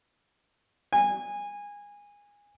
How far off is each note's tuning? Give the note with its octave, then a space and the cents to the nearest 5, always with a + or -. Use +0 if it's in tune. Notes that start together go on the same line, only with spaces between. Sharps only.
G#5 -20